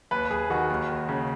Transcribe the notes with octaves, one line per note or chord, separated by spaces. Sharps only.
D#2 B4
D#2 G#4
D#3 F#4
D#2
D#2
C#3